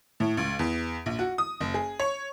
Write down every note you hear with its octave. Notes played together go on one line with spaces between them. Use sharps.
A2
C#2
E2
A#1
F#4
D#6
F#1
G#4
C#5